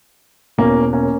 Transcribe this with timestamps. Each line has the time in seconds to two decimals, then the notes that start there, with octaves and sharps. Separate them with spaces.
0.58 E1 E2 B2 A#3 C#4
0.93 A#3 C#4